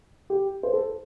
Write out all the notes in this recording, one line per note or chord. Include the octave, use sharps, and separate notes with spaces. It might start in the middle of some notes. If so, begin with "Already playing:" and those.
G4
C5
A4